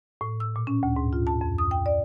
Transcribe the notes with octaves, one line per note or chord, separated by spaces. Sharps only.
A2
E6
A#2
C#4
D2
G#2
F4
A5
F2
D#6
G5
D5